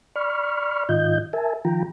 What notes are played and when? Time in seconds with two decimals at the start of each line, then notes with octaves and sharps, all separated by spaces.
0.16 D5 B5 C#6 F6
0.89 G#2 D#3 F4 D#5 G6
1.33 A#4 E5 G#5 A5
1.65 D#3 F3 F4 G5 A#5